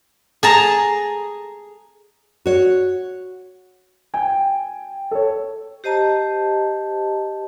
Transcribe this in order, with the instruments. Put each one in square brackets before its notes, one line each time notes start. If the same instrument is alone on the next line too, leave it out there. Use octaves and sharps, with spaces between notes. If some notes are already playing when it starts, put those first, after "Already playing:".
[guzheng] G#4 A5 A#5
[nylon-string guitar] F#4 C#5
[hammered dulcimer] G5 [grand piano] G#5
[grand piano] A4 C#5
[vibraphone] G4 C5 D#5 A5 A#5